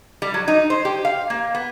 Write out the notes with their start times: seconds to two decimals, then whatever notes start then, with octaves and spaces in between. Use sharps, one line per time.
0.22 G3
0.34 F#3
0.48 D#4
0.70 C5
0.85 G4
1.05 F5
1.30 A#3
1.55 B3